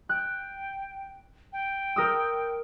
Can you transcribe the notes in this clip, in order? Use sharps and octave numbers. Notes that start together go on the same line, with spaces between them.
G5 F#6
G5
A#4 D#6 E6